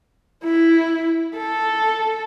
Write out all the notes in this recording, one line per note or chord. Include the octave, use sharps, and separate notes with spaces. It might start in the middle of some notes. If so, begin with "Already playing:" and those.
E4
A4